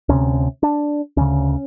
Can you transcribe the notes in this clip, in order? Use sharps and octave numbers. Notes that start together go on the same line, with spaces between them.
D2 C3 C#4
D4
D2 C#3 C#4